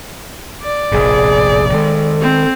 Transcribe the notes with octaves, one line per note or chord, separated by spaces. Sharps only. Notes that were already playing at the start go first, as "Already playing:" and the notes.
D5
F1 A#1 A2 G#4
D#3 G#3 A4
C4